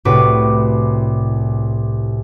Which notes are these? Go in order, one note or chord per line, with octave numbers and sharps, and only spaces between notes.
C2 A2 F#4 B4 D6